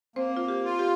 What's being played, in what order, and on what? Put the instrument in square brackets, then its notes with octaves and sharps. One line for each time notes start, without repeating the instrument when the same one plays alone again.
[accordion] A#3 [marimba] C4 C5
[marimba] F4
G4
[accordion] F4
[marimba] G4